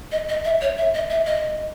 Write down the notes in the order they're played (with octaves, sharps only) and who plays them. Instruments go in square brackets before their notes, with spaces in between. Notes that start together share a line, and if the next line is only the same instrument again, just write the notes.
[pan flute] D#5
D#5
E5
C#5
E5
D#5
E5
D#5